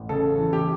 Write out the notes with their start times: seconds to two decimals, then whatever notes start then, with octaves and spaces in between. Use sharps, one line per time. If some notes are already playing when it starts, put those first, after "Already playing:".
Already playing: A1
0.09 C#3 A4
0.38 E3
0.53 G4